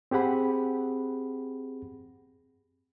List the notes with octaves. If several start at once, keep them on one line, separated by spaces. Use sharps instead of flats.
C4 G4 G#4 F#5 B5